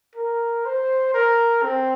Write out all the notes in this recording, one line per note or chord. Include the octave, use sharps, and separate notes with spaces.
A#4
C5
A#4
C4